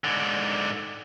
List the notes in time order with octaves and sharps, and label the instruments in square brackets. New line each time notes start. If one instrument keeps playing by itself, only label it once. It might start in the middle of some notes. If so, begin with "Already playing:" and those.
[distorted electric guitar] G#2 D3